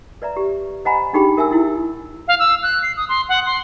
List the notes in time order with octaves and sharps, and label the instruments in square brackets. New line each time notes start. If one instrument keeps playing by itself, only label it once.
[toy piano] B4 D5 E5 A#5
G4
C5 D#5 F#5 G#5 A#5 B5
D4 D#4 G4 G#4 G5 B5
A#4 E5 G#5 E6
D#4 E4
[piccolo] F5
E6
F#6
C7
D#6
C6
F#5
C6